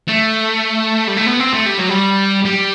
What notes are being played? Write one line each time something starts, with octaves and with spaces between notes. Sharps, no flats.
A3
G3
A3
B3
C4
A3
G3
F#3
G3
G3